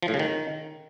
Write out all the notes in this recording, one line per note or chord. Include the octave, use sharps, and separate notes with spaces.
F3
A2
C#3
D#3